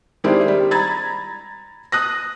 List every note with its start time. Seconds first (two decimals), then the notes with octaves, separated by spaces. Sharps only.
0.24 D#3 G3 G#3 C4 D4 E4
0.48 G3
0.71 A#5 B5 G#6 A6
1.92 D#6 F#6 A#6